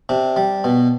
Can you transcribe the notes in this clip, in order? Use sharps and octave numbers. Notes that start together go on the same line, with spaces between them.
C3 D4
G3
B2